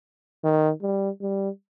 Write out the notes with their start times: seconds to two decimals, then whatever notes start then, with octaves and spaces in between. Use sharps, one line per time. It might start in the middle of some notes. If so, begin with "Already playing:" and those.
0.44 D#3
0.82 G3
1.22 G3